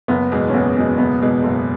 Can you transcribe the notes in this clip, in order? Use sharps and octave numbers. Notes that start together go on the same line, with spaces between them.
F#1 B3
E2 B2 G#3
C#4
F#1 B3
E2 B2 G#3
F#1 B3
E2 B2 G#3
F#1